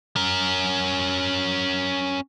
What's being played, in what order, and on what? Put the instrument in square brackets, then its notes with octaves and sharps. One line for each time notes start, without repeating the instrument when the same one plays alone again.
[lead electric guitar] C#4 A#4